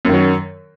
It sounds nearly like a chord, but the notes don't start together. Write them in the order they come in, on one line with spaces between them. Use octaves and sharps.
F#2 D#3 F#3